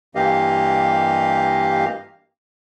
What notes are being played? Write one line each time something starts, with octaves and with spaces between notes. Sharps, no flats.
G2 E3 A#3 G4 D#5 F5